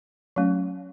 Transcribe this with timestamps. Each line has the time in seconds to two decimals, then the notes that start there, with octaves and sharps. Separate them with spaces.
0.36 F#3 A3 C#4